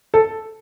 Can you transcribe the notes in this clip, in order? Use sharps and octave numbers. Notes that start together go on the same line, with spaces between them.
A4